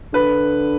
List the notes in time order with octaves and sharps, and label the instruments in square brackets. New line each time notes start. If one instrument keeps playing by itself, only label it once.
[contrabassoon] D3 [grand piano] B4